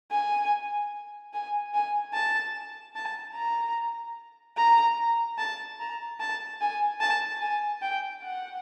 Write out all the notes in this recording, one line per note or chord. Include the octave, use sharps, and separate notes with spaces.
G#5
G#5
G#5
A5
A5
A#5
A#5
A5
A#5
A5
G#5
A5
G#5
G5
F#5